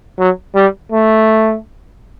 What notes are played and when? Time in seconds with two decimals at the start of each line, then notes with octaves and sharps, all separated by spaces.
0.19 F#3
0.55 G3
0.92 A3